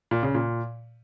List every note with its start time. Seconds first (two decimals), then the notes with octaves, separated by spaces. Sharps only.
0.11 A#2
0.23 C#3
0.35 A#2